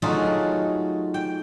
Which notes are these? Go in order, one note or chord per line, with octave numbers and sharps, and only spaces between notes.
F#3 A3 D#4 F4 F#4 G#4
G5